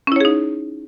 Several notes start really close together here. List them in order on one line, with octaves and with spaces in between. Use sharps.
C#4 E4 C#5 G#4 D#4